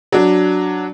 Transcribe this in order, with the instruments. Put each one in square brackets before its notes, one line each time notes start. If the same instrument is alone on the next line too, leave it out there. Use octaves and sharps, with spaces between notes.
[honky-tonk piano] F#3 D4